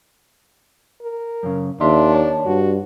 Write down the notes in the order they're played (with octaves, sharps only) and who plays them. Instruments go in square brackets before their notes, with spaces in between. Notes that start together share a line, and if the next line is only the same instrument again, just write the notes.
[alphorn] A#4
[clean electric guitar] F#2 C#3
[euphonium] D#2 [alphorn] D4 [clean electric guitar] E5 C6
[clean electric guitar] C#5 A5
[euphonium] G2 [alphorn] F#4